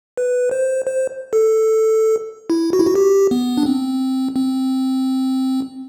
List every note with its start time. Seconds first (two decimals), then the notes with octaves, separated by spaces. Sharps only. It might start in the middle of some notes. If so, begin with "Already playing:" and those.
0.17 B4
0.51 C5
0.86 C5
1.33 A4
2.50 E4
2.73 F#4
2.79 E4
2.86 F#4
2.95 G4
3.31 B3
3.57 D4
3.66 C4
4.36 C4